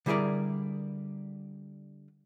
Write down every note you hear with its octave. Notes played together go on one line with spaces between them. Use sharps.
D3 G3 E4 G#4 A#4 D5